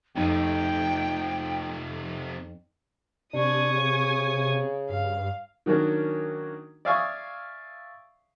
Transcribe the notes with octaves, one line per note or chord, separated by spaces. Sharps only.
F2 C3 A3 D#4 G5
C3 D4 G#5 C#6 D#6
C#3
G2 F5
D#3 F#3 A#3 C#4 D4
D5 E5 F5 G#5 C#6 D#6